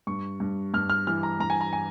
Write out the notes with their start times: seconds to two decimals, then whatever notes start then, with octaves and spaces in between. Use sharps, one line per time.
0.07 G2 C#6
0.40 G2
0.74 G2 F6
0.90 F6
1.07 E3 F6
1.23 A#5
1.40 G2 A#5
1.50 G#5
1.61 A#5
1.73 G#5